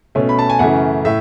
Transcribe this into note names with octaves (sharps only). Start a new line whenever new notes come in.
B2 A3 C#4
B5
A5
G#5
F#2 C#3 E3 A3 F#5
A2 E5